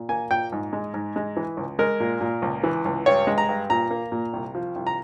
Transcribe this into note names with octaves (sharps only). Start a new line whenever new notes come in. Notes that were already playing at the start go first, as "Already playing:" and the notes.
Already playing: A#2
A#3 G#5
A#2 G5
G#2
G#3
G#2
G#3
E3
C#2
G#3 A#4
A#2
A#2
C#2
E3
C#2
G2 C#5
G#3
A#5
G2
A#2 A#5
A#3
A#2
C2
F3
C2
A#5